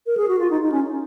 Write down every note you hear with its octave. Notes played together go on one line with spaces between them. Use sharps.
A#4
G#4
F#4
F4
D#4
D#4
C#4